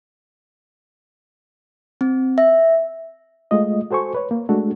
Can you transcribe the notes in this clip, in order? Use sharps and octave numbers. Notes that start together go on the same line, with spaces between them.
C4
E5
G#3 A3 F4 D#5
F#4 A4 C5 G#5 C#6
B4 C#5
A#3
G#3 A3 D4 F#4 A4